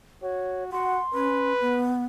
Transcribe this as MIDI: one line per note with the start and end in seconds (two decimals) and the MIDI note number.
0.22 0.71 66
0.22 0.64 73
0.72 0.99 66
0.72 0.99 78
0.72 1.54 84
1.13 1.53 61
1.13 1.89 71
1.60 2.05 59